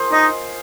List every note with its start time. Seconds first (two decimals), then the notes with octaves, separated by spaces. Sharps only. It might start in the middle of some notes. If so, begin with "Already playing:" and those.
Already playing: F4 G#4 A#4 C5
0.12 D#4 D#5